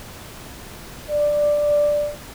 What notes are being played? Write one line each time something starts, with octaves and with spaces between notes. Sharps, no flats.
D5